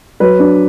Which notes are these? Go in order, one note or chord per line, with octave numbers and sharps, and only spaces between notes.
F#3 B4
D4